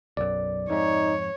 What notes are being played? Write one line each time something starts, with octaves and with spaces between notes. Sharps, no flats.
B1 F#2 D5
F2 G#2 D#4 C#5